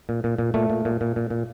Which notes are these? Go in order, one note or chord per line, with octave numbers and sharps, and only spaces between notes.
A#2
A#2
A#2
A#2 A3
A#2
A#2
A#2
A#2
A#2